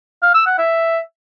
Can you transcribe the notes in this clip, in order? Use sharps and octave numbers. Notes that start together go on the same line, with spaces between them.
F5
E6
F#5
E5